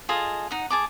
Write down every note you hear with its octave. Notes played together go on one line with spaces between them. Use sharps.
F4 G#4 A4 D#5
D#4 F#5
G#4 A5 D6